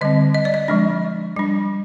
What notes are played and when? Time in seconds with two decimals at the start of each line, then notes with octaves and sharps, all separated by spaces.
0.01 D3 G3 C4 D#5
0.34 D#5
0.45 D5
0.54 D#5
0.68 F3 G#3 D4
1.36 G3 D4